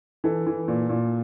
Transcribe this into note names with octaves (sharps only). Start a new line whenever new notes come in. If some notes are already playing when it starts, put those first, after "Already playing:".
E3 A4
E3
A#2
A#2